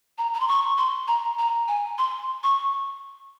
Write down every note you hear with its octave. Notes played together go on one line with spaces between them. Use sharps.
A#5
A#5
C6
C#6
C6
A#5
A#5
G#5
C6
C#6